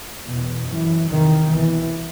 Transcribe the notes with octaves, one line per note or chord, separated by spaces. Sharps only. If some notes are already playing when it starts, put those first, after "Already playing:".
E2 B2
F#2 E3
E2 C3 D#3
C2 B2 E3